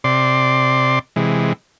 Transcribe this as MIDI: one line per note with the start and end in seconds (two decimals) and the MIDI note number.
0.04 0.99 48
0.04 0.99 74
0.04 0.99 84
1.16 1.53 48
1.16 1.53 52
1.16 1.53 56